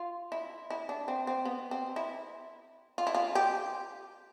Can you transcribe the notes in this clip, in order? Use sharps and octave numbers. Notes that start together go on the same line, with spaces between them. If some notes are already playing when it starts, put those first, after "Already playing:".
Already playing: F4
E4
E4
D4
C4
C4
B3
C4
E4
F4
E4
F4
G4